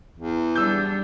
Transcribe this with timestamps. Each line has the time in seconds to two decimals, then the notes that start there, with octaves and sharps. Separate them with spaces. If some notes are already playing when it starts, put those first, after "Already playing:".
0.17 E2
0.56 G3 D4 E6 G6